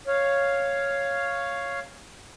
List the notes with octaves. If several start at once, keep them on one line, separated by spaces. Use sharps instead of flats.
C#5 F5